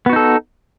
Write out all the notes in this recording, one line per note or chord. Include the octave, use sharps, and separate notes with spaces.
B3 D#4 F#4 A4